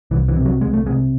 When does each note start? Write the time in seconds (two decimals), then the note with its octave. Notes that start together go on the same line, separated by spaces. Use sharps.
0.11 C2 E3
0.28 E3
0.36 C3
0.45 F#3
0.61 C2 G#3
0.73 A3
0.86 C3 G#3